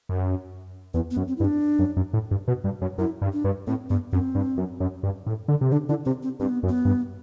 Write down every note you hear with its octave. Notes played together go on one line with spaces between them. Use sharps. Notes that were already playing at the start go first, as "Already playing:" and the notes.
F#2
E2 B3
B3
F#2
C4
E4
G2
D4
F#2
F#2
A2
G2
B2
G2
F#2
F#2 E4
G2
D4
G2
A2 C4
G2 B3
F#2 C4
G2
F#2
F#2
G2
A2
D3
C3
D3 D4
D3 E4
C3 C4
C4
G2 C4
B3
F#2
B3
G2